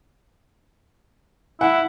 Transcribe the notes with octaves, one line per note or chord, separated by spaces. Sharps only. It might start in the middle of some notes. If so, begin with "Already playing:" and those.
E4 F#5